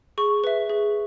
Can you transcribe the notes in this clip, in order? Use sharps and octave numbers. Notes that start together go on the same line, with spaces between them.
G#4 C#6
B4 E5
G#4